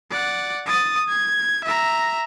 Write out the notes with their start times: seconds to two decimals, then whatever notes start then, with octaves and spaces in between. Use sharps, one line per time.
0.11 D5 F#5
0.66 D#6 A6
1.08 G#6
1.65 E5 A#5